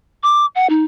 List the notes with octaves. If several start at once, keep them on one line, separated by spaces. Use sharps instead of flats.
D6
F#5
D#4